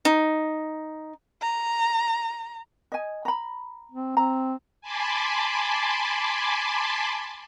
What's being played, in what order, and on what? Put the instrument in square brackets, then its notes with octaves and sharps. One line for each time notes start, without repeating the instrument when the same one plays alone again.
[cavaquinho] D#4
[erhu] A#5
[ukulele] D#5 G#5
A#5 B5
[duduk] C4
[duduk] C4 [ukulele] A#5
[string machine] G#5 A5 B5 C6 D6